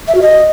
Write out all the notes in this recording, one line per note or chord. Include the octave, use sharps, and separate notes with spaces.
E5
F#4
D#5